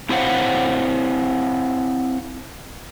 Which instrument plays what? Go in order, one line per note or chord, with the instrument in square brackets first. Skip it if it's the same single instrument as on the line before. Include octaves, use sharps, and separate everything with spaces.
[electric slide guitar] C4 E4 C5 C#5 F5 F#5